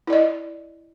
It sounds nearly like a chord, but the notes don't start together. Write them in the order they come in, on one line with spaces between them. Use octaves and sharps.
E4 D5 D#5